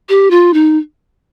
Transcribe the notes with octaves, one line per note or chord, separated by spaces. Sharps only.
G4
F4
D#4